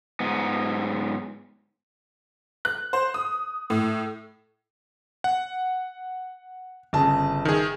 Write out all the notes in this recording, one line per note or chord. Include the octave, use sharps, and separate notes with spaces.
G#2 B3
F#6
C5
D#6
A2
F#5
G1 C#3 A5
D#3 G#4